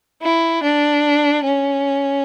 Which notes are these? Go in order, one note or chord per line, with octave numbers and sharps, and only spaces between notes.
E4
D4
C#4